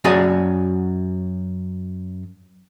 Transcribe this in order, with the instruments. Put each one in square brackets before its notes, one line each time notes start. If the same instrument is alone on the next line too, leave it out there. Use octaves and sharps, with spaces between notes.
[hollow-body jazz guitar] F#2 F#3 F#4 G#4 D5 G#5